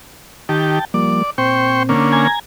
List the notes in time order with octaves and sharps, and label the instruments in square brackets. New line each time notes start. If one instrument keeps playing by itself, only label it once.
[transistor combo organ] D#3 G4 [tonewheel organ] G5 A5
[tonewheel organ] F3 G3 A#3 [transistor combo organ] D5
[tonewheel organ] A#2 C4 [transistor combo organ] C5 G5 C#6
[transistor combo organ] D3 A#3 C#4
[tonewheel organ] G#5 A#5 G#6